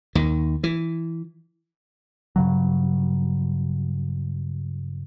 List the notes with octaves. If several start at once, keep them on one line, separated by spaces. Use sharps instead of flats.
D#2 D#3
E3
G2 C#3 F#3